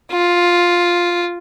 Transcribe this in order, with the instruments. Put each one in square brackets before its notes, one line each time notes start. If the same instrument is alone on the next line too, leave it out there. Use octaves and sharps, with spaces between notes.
[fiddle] F4